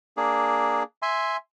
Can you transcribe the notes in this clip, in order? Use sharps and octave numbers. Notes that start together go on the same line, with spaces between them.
A#3 D4 G#4
E5 G#5 C6